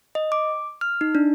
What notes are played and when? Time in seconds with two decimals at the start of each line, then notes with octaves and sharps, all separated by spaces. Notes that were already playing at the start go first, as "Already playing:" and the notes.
0.15 D#5
0.32 D6
0.81 F6
1.01 D#4
1.15 D4